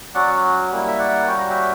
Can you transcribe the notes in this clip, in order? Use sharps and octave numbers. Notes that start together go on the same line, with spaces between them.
F#3 C#4 F#4 D5 F#5
G3 A#3 E4
E5
D5 F#5
G3 C#4 F#4 G5
A#5
E5 G5